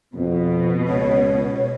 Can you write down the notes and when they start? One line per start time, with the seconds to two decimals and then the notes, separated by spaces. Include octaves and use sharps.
0.15 F2 B2
0.88 C#2 C#5